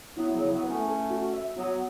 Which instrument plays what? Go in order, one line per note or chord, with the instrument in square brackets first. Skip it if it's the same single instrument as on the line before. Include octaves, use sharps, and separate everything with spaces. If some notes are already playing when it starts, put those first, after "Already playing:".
[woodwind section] F#3 B3 [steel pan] E4
[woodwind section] C#3 F#3
[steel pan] E4
[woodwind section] F#3 B3
[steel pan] B4
[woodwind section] A3 C#4
[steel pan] A4
F#4
E5
[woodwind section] F#3 B3 [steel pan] F#4